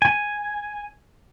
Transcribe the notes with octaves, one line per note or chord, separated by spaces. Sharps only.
G#5